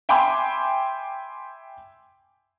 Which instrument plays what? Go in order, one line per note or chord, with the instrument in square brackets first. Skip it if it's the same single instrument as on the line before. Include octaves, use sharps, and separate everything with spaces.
[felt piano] E5 G5 G#5 B5 C6 D6